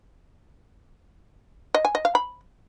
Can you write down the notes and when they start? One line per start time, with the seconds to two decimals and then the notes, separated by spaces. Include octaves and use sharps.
1.75 D#5
1.85 G#5
1.95 D#5
2.05 F5
2.15 B5